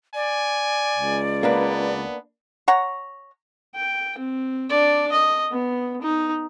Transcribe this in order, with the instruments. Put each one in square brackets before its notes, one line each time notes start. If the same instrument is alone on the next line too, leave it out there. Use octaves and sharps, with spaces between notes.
[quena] D5 [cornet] G#5
[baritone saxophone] C#2
[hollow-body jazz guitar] A#3 D4 B4 [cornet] B3
[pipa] C#5 F#5 A#5
[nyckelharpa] G5
C4
D4 D5
D#5
B3
D#4